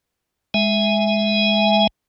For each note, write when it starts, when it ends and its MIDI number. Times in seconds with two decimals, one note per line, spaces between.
0.54 1.87 56
0.54 1.87 76
0.54 1.87 80